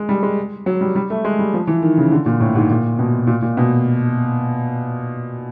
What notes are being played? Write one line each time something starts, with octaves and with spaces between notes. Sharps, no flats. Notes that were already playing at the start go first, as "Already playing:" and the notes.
Already playing: G#3
G3
G#3
F#3
G3
G3
A3
G#3
G3
F3
E3
D#3
C#3
D3
A#2
A2
G#2
A#2
B2
A#2
A#2
B2